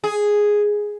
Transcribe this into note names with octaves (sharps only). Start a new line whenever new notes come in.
G#4